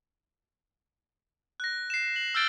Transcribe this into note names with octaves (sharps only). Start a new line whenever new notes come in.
F#6 A#6
C7 E7
F#7
E6 F6 G6 A6 D7 G7